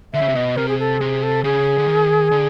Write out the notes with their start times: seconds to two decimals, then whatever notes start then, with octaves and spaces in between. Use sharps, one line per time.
0.13 D3 E5
0.21 C#3
0.28 C3
0.35 B2 D#5
0.57 C3 A#4
0.68 G#4
0.79 A4
1.00 C3 G#4
1.23 A4
1.43 C#3 G#4
1.78 D3
1.87 D#3
2.31 D3